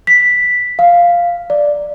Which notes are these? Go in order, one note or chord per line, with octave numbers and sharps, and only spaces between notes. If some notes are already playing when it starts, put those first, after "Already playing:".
B6
F5
D5